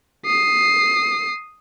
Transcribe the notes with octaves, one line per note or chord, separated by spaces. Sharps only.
D#6 C7